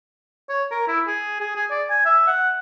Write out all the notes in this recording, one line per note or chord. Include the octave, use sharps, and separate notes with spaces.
C#5
A#4
E4
G#4
G#4
G#4
D5
G#5
E5
F#5